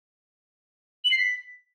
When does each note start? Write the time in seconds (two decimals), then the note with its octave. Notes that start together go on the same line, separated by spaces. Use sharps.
1.04 F#7
1.11 C7
1.18 B6